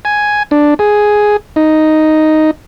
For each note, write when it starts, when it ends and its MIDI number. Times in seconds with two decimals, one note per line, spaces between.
0.05 0.43 80
0.51 0.74 62
0.79 1.37 68
1.56 2.51 63